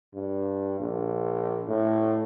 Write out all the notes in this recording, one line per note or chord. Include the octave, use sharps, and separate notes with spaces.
G2
A#1
A2